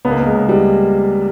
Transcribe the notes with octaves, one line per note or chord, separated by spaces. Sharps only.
C#2 B3
A#3
B3
G#3
C#2
G3